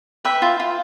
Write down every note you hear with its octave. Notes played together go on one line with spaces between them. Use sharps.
B4 E5 G5
F4
F4